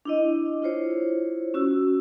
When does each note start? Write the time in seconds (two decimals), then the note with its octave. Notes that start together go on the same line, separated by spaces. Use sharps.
0.05 D4 E4 D#5
0.62 E4 F4 C5 C#5
1.54 C#4 F#4 E6